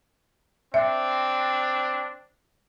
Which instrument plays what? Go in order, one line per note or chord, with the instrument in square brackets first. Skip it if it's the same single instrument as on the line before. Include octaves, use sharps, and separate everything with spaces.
[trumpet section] C4 D4 [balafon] E5